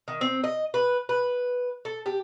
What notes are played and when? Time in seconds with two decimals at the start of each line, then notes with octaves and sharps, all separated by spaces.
0.08 D#3
0.21 C4
0.44 D#5
0.74 B4
1.09 B4
1.85 A4
2.06 G4